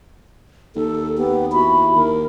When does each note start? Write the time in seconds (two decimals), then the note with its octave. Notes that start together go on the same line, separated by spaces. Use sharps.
0.76 D#2 A4
1.18 B3 G4
1.52 E4 F#4 B5
1.96 D#2 A#4